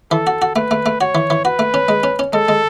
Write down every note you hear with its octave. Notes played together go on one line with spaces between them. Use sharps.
E3 A4
F#4
F#4
A3 B4
A3
A3
F#4 C#5
E3
E3
F#4 B4
A3
C#4
G#3
C#4
C#4
G#3 A4
G#3